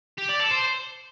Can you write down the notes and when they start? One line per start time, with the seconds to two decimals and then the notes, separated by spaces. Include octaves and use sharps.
0.18 G4
0.29 D5
0.40 A4
0.51 C5